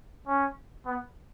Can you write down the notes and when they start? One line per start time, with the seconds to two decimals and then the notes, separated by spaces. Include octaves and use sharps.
0.27 C#4
0.86 B3